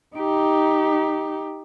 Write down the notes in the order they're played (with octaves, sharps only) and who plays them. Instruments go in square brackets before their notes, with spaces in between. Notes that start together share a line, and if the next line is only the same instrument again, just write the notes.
[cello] D#4 G4